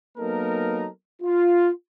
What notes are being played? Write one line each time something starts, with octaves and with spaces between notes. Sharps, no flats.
F#3 A#3 B3 D#4 A4 A#4
F4